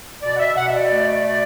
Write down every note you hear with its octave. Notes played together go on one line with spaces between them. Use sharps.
B2 D5
F#5
E5
B2 F#5
E5
D5
A3
B2